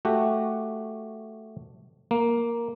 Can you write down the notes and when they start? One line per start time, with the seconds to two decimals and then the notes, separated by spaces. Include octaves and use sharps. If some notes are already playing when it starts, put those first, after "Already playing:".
0.05 A3 F#4 G4
2.11 A#3